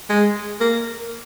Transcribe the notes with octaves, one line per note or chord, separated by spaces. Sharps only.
G#3
A#3